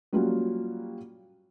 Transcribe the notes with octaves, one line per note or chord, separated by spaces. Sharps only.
F#3 G3 A#3 C#4 F4 F#4